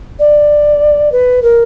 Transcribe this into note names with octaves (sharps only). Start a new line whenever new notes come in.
D5
B4
A#4